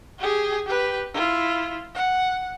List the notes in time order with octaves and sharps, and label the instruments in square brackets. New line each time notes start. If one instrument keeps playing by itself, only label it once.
[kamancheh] G4 G#4
G4 B4
E4 F4
F#5